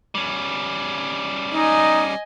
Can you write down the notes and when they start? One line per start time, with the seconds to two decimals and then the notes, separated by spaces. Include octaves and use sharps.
0.15 G3 C#4
1.54 D#4 D#5 G#5